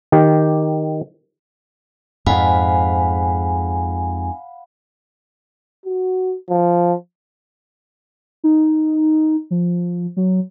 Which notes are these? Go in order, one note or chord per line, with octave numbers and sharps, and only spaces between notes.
D#3 G4
F2 G#2 F5 F#5 G#5 B5
F#4
F3
D#4
F3
F#3